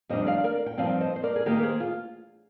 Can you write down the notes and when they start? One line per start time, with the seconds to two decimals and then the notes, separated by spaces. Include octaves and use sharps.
0.09 F2 D#3 G3 D4 C5 D#5
0.26 D5 F5
0.44 A#4 D5
0.66 G5
0.78 G2 F3 C4 D#4 D5 F5
1.01 C5 D#5
1.16 C5
1.23 A#4 D5
1.36 G#4
1.46 D#3 A#3 D#4 G4 A#4
1.63 G#4 C5
1.80 F4